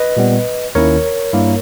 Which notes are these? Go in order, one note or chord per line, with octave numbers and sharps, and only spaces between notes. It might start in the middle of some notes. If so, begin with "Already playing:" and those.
Already playing: B4 D#5
A#2 G3 B3
D#2 D#3 A#3 C#4 E4 A#4 C#5
G2 G3 A#3 E4